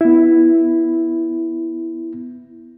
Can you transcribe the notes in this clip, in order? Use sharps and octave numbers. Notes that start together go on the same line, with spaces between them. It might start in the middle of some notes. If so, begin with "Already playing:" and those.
B3 E4